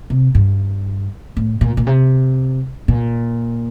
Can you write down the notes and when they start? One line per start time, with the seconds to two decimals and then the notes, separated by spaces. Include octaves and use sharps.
0.10 C3
0.35 G2
1.37 A2
1.61 A#2
1.77 A#2
1.87 C3
2.88 A#2